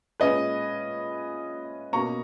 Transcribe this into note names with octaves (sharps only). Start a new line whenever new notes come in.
A#2 G#3 C#4 B4 D#5
B2 A#3 C#4 A#5 C#6